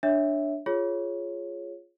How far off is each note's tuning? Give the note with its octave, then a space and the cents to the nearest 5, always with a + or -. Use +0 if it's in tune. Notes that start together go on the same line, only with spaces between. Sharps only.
D4 +0 C#5 +0 E5 -10
F4 +0 G#4 +0 C#5 -10